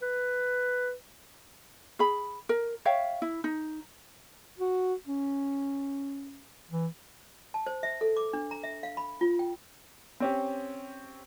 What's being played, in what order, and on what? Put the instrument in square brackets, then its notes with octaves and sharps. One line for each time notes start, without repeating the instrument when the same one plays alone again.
[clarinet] B4
[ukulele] G#4 B5
A#4
C#5 E5 F5 G5
E4
D#4
[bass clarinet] F#4
C#4
E3
[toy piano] A5
C5
E5
A4
D6
D4
A#5
E5
F5
B5
F4
G5
[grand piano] C4 C#4 G4